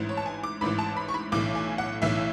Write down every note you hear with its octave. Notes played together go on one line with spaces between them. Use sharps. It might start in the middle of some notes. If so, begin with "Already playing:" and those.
Already playing: A1 G#2 E3
C#5
A5
G#5
D6
A1 G#2 E3 B5
A5
B5
C#6
B5
B1 A2 E3 D6
G#5
F#5
B1 A2 E3 E5